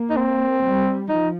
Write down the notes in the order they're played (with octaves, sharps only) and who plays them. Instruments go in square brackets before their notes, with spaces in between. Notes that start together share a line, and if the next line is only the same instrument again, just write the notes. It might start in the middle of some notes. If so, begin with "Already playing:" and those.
Already playing: [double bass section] A#3
[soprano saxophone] D#4
C4
[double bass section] G3
[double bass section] F3 [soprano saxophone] D#4